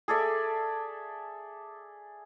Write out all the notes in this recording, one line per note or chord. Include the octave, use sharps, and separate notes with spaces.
G#4 A4 D5 E5